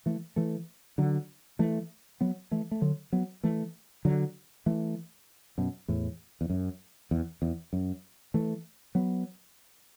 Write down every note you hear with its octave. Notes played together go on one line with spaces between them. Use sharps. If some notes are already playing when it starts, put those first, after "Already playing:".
E3 A3
E3 A3
D3 F#3
E3 A3
F#3 B3
E3 A3
A3
D3 F#3
F#3 B3
E3 A3
D3 F#3
E3 A3
F#2 B2
E2 A2
E2
F#2
E2
E2
F#2
E3 A3
F#3 B3